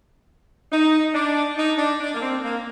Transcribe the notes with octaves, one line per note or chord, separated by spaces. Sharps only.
D#4
D4
D#4
D4
D4
A#3
C4
A#3